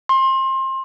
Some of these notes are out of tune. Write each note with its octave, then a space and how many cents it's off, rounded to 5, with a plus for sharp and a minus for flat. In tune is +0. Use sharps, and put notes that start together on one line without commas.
C6 +25